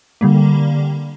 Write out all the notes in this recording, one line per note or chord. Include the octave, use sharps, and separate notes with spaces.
D3 G3 A#3